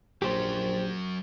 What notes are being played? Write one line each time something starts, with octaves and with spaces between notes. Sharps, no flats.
A#1 F#3 C#4 G4 C5